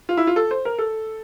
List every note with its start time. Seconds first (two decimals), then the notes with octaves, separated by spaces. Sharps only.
0.09 F4
0.17 E4
0.27 F4
0.36 A4
0.51 C5
0.65 A#4
0.79 A4